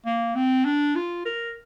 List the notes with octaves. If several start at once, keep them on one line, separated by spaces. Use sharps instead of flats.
A#3
C4
D4
F4
A#4